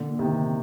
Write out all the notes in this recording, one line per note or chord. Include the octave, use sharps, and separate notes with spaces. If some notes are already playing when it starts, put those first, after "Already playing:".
Already playing: A#2 D3
C3 D#3